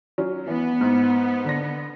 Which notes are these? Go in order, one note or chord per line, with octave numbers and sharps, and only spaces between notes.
F#3 C#4
E3 B3
G#2
D3 D4 A#6